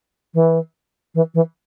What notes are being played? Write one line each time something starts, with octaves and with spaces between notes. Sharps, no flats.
E3
E3
E3